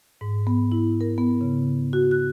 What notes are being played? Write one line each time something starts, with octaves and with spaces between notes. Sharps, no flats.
G#2
B3
E4
A#4
B3
C#3
F#4
F#6